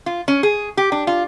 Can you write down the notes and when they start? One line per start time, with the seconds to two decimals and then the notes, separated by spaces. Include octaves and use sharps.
0.06 F4
0.28 C#4
0.43 G#4
0.77 G4
0.92 D4
1.07 F4